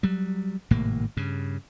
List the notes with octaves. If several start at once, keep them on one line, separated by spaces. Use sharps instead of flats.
F#3 G3
G#1 A2 C3 A#3
G2 C#3